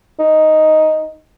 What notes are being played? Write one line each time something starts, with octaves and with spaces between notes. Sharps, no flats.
D#4